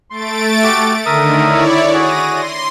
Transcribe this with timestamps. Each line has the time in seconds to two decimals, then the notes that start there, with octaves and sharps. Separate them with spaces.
0.10 A3 C6 A6 D7
0.63 F#4 G4
1.06 D3 D#3 A#4 E5 D#6
1.41 E4 C#5 D5
1.94 F#4 G#4 A#6 D#7
2.35 C6